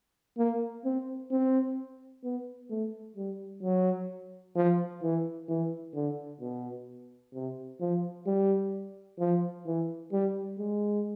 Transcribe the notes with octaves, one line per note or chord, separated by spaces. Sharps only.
A#3
C4
C4
B3
A3
G3
F#3
F3
E3
E3
D3
B2
C3
F3
G3
F3
E3
G3
G#3